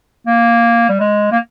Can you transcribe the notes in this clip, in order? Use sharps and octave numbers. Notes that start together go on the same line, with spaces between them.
A#3
G3
G#3
A#3